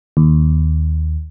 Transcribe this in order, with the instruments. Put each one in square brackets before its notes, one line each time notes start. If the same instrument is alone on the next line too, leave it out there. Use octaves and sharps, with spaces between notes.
[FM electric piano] D#2